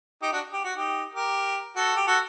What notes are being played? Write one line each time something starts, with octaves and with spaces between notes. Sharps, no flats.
D#4 G4
D4 F#4
G4
F#4
D#4 G4
G4 A#4
F#4 A4
G4
F#4 A4